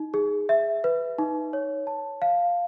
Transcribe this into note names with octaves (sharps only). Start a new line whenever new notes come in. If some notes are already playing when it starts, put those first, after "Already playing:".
Already playing: D#4
G#4
E5
B4
D#4
C#5
A5
F5